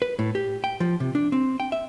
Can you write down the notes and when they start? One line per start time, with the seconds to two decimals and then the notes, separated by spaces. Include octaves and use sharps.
0.02 B4
0.19 A2
0.35 G4
0.64 G5
0.80 F3
1.00 C3
1.15 D4
1.32 C4
1.60 G5
1.72 E5